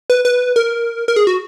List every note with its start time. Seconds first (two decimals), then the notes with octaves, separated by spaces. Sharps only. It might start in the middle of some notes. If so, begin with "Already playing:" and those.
0.10 B4
0.25 B4
0.56 A#4
1.08 A#4
1.16 G#4
1.27 F#4